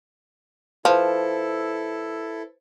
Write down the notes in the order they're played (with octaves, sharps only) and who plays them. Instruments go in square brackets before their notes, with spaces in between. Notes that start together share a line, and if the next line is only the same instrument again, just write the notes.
[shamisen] F3 [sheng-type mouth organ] E4 A4 [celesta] B4 C5